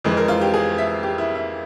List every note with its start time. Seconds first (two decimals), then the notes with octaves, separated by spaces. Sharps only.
0.04 F2 E3 G#3
0.17 A#4
0.28 F4
0.41 G4
0.54 G#4
0.78 E5
1.03 G4
1.18 E4
1.35 E4